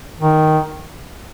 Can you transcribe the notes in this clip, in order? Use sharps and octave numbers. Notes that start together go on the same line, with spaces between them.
D#3